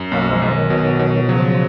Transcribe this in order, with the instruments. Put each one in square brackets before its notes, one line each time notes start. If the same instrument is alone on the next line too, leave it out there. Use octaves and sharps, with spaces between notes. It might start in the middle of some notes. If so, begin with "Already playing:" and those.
Already playing: [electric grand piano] F#2
[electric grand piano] B1 [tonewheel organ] F#3 A#3
[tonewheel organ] F3 G#3
[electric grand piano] B1
[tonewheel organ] D#3 F#3
[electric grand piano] B2
B2
[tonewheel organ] C#3 F3 [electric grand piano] F#3